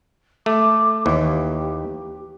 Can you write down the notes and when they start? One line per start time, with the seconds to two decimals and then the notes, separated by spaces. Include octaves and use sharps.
0.46 A3 D6
1.06 D#2 E3 G4